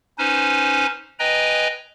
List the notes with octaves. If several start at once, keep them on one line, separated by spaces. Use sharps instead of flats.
C#4 D#4 B4 C5 G#5
B4 D#5 G5 G#5 A#5